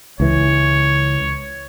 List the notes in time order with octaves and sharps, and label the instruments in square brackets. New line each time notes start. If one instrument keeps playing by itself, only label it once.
[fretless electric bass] C#2 E3 [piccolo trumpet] C#5